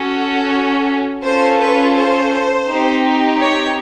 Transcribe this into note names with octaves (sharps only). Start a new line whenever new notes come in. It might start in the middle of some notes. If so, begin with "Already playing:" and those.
Already playing: C#4 F#4 A4
C#4 F4 A4 C5
B4
C5
C4 D#4 G4
C#5